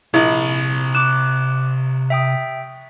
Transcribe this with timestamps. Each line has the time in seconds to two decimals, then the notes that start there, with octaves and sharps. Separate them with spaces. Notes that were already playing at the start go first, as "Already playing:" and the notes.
0.14 A#1 C3 E4 B5
0.95 D6 F#6 E7
2.10 E5 G5 D#6